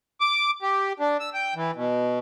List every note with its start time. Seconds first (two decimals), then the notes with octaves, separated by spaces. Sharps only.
0.21 D6
0.62 G4
0.99 D4
1.20 E6
1.34 G5
1.55 E3
1.76 B2